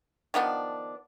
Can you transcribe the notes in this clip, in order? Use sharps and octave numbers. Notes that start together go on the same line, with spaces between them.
D#3 F3 B3 D4